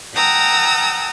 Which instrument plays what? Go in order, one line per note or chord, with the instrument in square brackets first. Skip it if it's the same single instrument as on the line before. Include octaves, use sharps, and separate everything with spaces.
[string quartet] F#5 G5 A5 A#5 D#6 E6